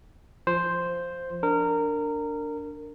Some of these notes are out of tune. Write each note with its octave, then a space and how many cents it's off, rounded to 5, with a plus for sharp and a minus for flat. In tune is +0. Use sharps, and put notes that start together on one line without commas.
F3 -10 C5 +0
D4 +0 A#4 -20